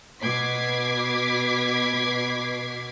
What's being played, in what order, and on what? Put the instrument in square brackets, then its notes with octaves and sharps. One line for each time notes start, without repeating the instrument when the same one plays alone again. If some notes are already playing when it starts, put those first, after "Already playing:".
[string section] B2 B4 D6 G#6 B6 C7